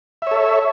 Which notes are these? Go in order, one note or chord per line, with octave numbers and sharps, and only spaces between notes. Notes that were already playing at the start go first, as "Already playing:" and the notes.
A4 C#5 E5